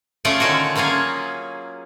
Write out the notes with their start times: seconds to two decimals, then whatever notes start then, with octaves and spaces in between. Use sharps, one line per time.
0.25 A3 C#4 F4 G#4 D5
0.40 D3 D#3 C#4 F4 F#4
0.76 F#3 A#3 C#4 F4 G#4